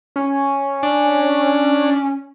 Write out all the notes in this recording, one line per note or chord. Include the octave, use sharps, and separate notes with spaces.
C#4
D4